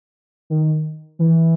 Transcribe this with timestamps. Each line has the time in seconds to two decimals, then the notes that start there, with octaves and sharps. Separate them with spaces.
0.50 D#3
1.19 E3